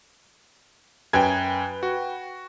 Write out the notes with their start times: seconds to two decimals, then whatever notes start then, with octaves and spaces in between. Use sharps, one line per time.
1.13 F#2 B4 G5 G#5 G#6
1.83 F#4